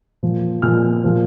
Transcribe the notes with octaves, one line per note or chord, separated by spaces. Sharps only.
A#2 F3
A#2 F3 F6
A#2 F3